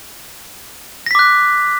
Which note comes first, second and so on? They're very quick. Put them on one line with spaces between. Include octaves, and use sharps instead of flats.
A#6 B6 D6 F#6